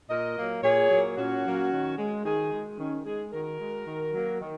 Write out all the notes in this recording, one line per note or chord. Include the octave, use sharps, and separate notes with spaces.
A#2 A#4 D#5
F#3 A#3
A#2 G#4 C#5
F#3 A#3
A#2 C#4 F#4
F#3 A#3
D#3
G#3
D#3 D#4 G#4
G#3
D#3 C#4
G#3 D#4 G#4
D#3 F#4 A#4
G#3
D#3
F#3 A#3
D#3